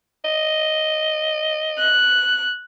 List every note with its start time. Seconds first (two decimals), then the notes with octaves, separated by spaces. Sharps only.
0.24 D#5
1.79 F#6